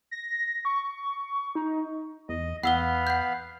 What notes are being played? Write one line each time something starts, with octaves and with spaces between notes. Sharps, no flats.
A#6
C#6
D#4
E2 D#5
E2 B3 F5 F#5 B5 E6 G7
F#5 G6